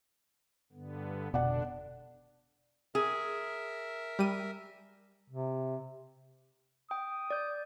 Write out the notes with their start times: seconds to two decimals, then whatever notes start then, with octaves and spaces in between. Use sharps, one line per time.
0.72 G2 D3 B3
1.34 F1 B2 D3 B3 D4 D5 F#5
2.95 G#4 A#4 E5
4.19 G3 D#7
5.28 C3
6.91 G5 D#6
7.30 D5 G6